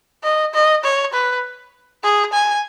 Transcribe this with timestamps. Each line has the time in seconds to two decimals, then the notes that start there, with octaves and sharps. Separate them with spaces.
0.24 D#5
0.54 D#5
0.84 C#5
1.13 B4
2.03 G#4
2.33 G#5